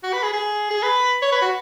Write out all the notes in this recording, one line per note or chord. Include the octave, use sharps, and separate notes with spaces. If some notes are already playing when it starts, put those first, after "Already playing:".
F#4
B4
G#4
G#4
G#4
B4
C#5
B4
F#4